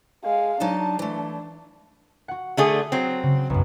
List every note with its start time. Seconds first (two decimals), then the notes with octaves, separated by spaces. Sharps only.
0.24 G#3 F5
0.60 F#3 D4 D#4 A5
0.99 E3 A3
2.28 F#4 F#5
2.57 D3 A3 G#4
2.92 F#3 C4 A#6
3.23 C#3
3.50 B1 F#2